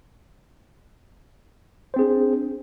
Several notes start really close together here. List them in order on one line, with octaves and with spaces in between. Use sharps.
C5 C4 G#4 D4